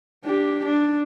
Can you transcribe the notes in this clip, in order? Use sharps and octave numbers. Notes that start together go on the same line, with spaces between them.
D4 G4
D4